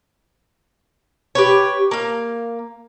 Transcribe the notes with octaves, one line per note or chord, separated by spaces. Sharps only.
G4 B4 C#5
A#3 F5